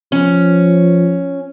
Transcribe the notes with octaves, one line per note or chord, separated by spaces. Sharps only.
F3 C#4